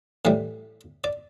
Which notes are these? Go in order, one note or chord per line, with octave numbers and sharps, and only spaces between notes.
A2 E3 G3
D5